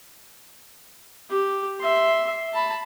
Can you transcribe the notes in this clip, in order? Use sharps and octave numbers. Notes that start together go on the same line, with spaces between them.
G4
E5 C6
A5 B5